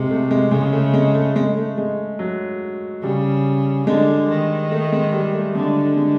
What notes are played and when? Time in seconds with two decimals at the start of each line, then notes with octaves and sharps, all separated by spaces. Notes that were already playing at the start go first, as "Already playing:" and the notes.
Already playing: C3 G#3
0.10 A3
0.31 G#3
0.51 C#3 G#3
0.73 A3
0.94 G#3
1.14 A3
1.36 G#3
1.57 A3
1.78 G#3
2.19 F#3
3.03 C#3 G3
3.87 D3 G#3
4.29 D#3
4.71 A3
4.92 G#3
5.12 G3
5.34 A3
5.55 D3 G#3
5.97 G#3